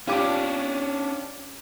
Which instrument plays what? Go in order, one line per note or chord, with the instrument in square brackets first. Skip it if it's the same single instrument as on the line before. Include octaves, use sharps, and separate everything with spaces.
[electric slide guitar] C#4 D4 [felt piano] F4 G4 D6